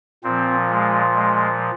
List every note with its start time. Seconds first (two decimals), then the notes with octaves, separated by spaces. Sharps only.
0.24 A#2 F3 C4
0.70 G#3
1.16 G#3